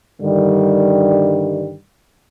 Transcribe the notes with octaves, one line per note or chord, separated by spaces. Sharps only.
G2 D3 D#3 G3